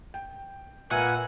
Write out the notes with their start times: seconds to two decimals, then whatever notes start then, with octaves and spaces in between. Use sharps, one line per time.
0.14 G5
0.91 A#2 A#3 B4 E5 F#5 G#5